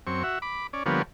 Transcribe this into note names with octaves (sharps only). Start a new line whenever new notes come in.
F#2 C4 C#6
F#4 E5
B5 D6
C#4 D5
D3 F3 G3 A#3 B3 C#5